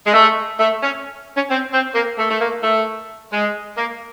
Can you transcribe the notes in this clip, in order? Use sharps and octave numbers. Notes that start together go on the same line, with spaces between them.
G#3
A3
A3
C#4
C#4
C4
C4
A#3
A3
A3
A#3
A3
G#3
A#3